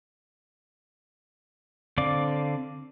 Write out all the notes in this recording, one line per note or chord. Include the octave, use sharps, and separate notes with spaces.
D3 C4 D5 F5 D6